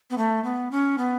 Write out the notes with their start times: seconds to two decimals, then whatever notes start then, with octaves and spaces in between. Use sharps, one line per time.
0.10 B3
0.18 A3
0.44 B3
0.71 C#4
0.98 B3